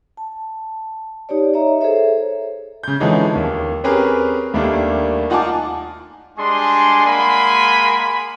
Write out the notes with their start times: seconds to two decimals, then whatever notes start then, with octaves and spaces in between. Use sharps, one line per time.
0.17 A5
1.29 D#4 G4 C#5 D5
1.54 C#5 D#5 E5 A#5
1.81 G#4 A4 C5 C#5 E5
2.83 C#3 G6
3.00 D3 E3 F3 G#3 C#4 D#4
3.35 D#2
3.84 C4 C#4 G4 G#4 A#4 B4
4.54 D#2 G3 A3 A#3 D4
5.30 D#4 F4 F#5 G#5 A5 D6
6.38 G3 G#3 D4 G#4 C6
7.06 G#3 A#3 F#5 G#5 B5 C6